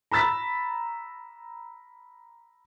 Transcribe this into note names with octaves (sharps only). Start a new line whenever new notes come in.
A#5 B5 E6 A6 B6